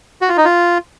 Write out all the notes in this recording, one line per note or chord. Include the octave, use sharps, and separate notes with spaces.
F#4
F4
D#4
F4